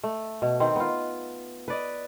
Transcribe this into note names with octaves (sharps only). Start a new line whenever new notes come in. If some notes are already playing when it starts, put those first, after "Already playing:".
A3
B2
D#3 C4
B3 F4
B4 D5 D#5